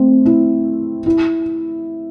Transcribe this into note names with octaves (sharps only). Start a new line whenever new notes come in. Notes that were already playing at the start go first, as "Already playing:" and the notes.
Already playing: A3 C4
E4
E4